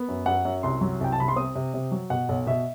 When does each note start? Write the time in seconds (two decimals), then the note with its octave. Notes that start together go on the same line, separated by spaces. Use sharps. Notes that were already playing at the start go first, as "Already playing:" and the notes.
Already playing: B3
0.08 F#2
0.26 F#2 F#5
0.45 F#2
0.63 C2 C6
0.81 F#3
1.01 C2 G5
1.12 A5
1.18 C3 B5
1.28 C6
1.36 C4 D#6
1.55 C3
1.74 C3
1.92 F#3
2.10 B2 F#5
2.29 B1
2.47 B2 E5